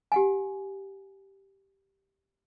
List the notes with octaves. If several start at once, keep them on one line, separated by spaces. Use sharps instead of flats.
G4 F#5 G#5